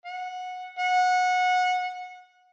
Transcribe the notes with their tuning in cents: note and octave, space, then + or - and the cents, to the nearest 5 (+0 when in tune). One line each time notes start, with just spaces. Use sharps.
F#5 -15
F#5 -20